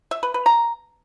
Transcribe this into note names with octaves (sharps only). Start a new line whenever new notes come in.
E5
B4
B4
A#5